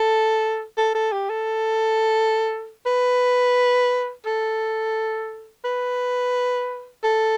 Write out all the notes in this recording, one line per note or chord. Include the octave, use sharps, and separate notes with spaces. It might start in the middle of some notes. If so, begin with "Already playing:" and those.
Already playing: A4
A4
A4
G4
A4
B4
A4
B4
A4